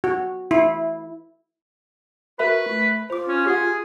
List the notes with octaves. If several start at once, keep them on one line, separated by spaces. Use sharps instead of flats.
F#4
E4
F#4 A#4 B4 E5 B5
A3
F4 C5 D6
C#4
G4 G#4 F#5